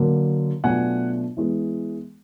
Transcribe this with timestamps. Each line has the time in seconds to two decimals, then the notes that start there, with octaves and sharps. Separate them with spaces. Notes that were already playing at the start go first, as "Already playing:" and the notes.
Already playing: D3 F#3 A#3
0.64 B2 F#3 A3 D4 F4 F#5 G#5
1.37 E3 G#3 B3